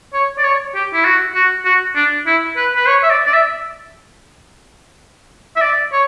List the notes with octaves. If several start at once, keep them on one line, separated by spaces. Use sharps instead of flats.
C#5
D5
C#5
G4
E4
F#4
F#4
F#4
D4
E4
B4
B4
C#5
E5
D5
D5
E5
E5
D5
C#5